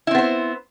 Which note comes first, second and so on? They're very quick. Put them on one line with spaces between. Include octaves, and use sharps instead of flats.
E4 C4 B3 C5